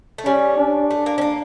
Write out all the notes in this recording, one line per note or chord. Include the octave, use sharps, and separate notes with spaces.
A3
G3 C#4
D4
A3
A#3
C#4
A#3